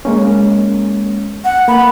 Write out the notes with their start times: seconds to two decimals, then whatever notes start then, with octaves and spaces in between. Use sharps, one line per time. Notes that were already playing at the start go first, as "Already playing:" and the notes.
0.05 G#3 A#3 C#4
1.45 F#5
1.68 A#3 B5